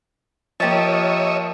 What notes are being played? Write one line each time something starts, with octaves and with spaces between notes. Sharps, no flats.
F3 A#3 G4 C#5 D#5 E5 A5